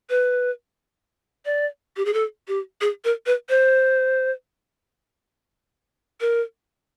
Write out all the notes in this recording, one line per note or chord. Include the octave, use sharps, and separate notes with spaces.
B4
D5
G4
G#4
A4
G4
G#4
A#4
B4
C5
A#4